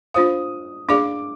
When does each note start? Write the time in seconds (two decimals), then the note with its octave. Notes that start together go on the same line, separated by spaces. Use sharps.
0.14 D4 F4 C5 F5 D#6
0.89 D4 G#4 D5 F5 D6